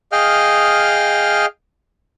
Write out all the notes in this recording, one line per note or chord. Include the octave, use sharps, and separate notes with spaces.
G#4 D#5 F5 G5 F6